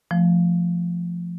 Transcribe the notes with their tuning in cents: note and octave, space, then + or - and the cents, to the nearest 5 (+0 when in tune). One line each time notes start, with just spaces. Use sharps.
F3 -10 A3 +0